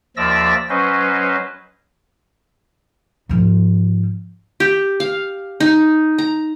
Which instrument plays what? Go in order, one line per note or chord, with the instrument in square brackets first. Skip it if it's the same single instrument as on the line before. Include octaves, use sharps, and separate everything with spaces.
[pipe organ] D#2 F3 D5 E5 E6 A#6
F#3 C#4 B4 C5 D#5
[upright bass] G#2 F3
[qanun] G4
F5
D#4
A#5